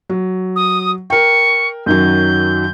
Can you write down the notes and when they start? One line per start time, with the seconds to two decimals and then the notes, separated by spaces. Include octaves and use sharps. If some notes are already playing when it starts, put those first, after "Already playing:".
0.10 F#3
0.56 D#6
1.10 A#4 G5 C#6
1.86 F#2 D#3 F#3 G6